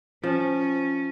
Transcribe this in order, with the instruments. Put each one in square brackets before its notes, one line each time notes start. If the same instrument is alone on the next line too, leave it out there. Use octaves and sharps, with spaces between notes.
[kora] F3 [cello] C#4